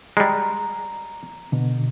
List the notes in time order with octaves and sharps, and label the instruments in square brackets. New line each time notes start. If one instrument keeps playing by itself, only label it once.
[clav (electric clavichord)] G3 G#3 [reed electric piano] A#5
[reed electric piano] B2 D3